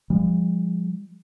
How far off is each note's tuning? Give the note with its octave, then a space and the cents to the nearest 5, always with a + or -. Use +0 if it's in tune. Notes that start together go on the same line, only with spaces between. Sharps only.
F3 +0 G#3 -45